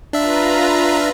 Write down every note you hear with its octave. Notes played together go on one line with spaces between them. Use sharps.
D4 F4 B4 E5 A#5